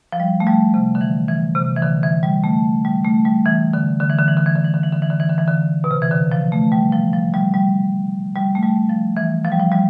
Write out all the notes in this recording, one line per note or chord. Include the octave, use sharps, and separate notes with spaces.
F3
G3
A3
G3
C3
D3
E3
E3
C3
E3
D3
E3
G3
A3
G3
A3
G3
E3
D3
D3
E3
D3
E3
D3
E3
D3
E3
D3
E3
D3
E3
D3
E3
D3
E3
D3
B2
C3
E3
D3
F3
A3
G3
F3
F3
G3
G3
G3
A3
G3
F3
E3
F3
G3
F3
G3